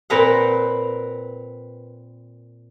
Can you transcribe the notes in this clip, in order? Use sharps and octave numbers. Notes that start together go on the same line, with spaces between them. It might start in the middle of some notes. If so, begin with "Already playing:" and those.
A#2 C4 A#4 B4 F5 F#5